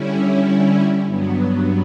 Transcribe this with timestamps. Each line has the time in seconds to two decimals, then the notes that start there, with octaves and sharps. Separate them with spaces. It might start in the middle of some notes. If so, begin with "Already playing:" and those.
Already playing: D3 G3 C#4 E4
1.06 G2 F#3 B3